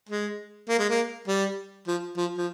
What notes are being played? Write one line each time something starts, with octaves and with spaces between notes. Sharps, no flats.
G#3
A#3
G#3
A#3
G3
F3
F3
F3